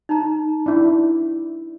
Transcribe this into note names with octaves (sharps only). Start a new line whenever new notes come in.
D#4 A#5
D4 E4